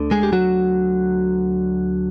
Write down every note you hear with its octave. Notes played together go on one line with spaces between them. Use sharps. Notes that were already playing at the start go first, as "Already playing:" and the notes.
Already playing: D2 D3
G#3 G#4
G4
F#3 F#4